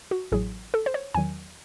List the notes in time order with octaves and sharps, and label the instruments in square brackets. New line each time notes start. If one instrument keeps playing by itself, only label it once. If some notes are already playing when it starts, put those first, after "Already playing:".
[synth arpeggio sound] F#4
A1 A2 F#3 G#4
A4
C5
C#5
E2 D#3 F#3 G#5